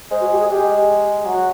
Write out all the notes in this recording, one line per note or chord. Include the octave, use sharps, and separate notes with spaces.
G#3 C5
F#4
G4
G#4
G#3 G4
F#3 F#4